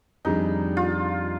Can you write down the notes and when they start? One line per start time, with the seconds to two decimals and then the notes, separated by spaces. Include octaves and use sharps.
0.25 F2 D#3 G3 D4 D#4 G#4
0.77 F4